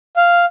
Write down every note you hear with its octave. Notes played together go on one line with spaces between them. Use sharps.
F5